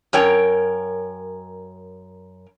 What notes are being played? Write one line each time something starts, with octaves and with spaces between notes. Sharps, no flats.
F#2 A#4 C#5 G5